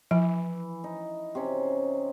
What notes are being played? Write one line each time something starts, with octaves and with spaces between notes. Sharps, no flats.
E3 F3
D#4
C3 C#4